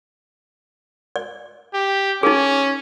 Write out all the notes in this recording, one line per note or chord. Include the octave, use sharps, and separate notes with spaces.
D5
G4
C#4 D#4 G#4